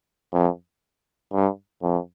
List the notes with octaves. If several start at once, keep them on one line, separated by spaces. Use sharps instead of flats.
F2
G2
F2